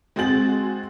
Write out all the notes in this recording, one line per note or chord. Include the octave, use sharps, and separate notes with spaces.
G#3 C4 F#4 G#4 A6 F#7